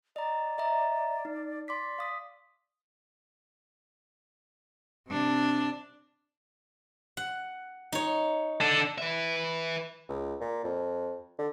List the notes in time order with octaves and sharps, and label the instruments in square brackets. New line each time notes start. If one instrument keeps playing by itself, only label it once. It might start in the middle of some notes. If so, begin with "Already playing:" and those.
[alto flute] D5 [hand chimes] D#5 A#5
[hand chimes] D#5 E5 A#5
D#4
[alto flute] D5 [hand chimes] C6 D6 B6
[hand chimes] F5 D#6 B6
[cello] C3 D4
[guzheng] F#5
D#4 C#5
[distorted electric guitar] D4 A4
[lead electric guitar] B4 E5
[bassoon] C#2
A#2
F2
D3